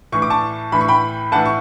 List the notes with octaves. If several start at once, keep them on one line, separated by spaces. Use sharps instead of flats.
A2 E3 C#6
D6
A5 C#6
A2 E3 B5
C#6
G5 B5
A2 E3 F#5 A5
C#6